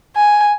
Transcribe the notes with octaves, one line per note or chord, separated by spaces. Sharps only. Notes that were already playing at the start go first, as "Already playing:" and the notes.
G#5